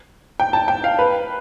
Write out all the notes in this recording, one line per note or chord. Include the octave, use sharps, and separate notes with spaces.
G5
A5
G5
F5
B4